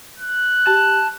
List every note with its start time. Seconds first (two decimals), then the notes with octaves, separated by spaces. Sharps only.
0.18 F#6
0.67 G4 A5